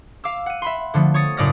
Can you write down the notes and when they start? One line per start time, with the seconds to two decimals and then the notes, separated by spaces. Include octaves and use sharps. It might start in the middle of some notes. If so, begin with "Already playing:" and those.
0.24 F5 D6 E6
0.46 F#5 D#7
0.62 E5 B5 C6
0.94 D3 F3 A3 B3
1.14 C#5 C#6 D#6 A6 C#7
1.37 F#1 A2 D5 D#6 F6 A#6